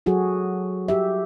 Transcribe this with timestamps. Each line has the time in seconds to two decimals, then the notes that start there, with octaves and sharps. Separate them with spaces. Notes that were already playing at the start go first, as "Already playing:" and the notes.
0.06 F#3 F#4 G#4 A4
0.88 G4 E5